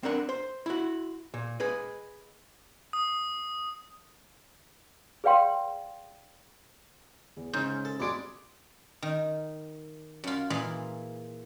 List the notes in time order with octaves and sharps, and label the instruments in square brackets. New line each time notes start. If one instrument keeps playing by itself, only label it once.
[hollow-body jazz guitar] C4 D4 A#4 F#5
C5
E4 F#4
A#2
G#4 B4 D#5
[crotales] D#6
[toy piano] G#4 B4 D5 F5 G5 C6
[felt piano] E2
[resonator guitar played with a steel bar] G#2 [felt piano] C#3 C#4 [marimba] G6
[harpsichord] A4
[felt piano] F1 F#4 D7 [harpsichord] G3 G#3 D4
[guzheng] D#3
F#2 F4
A#2 E3 F4 G#4 F5